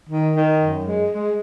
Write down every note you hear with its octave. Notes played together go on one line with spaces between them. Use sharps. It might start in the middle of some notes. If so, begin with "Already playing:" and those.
D#3
D#3
F#2
G#3
G#3